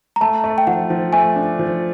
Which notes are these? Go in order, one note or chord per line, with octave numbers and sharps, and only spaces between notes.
A#5
A3 A5
A3
G5
F3 F#5
F3
A3 G#5
D4
F3